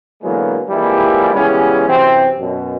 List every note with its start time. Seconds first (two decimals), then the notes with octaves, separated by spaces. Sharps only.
0.22 D3 E3 F#3 G#3 A#3 B3
0.69 F2 E3 G3 G#3 A#3 E4
1.34 C#3 E3 G3 G#3 B3 C#4
1.88 F#2 C3 E3 C4
2.39 F#2 B2